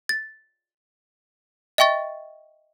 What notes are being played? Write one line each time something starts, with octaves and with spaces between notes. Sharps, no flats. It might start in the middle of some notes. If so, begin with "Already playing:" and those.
A6
D#5 E5 G5 C#6 A6